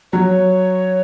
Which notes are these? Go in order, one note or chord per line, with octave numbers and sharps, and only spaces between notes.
F#3 C#5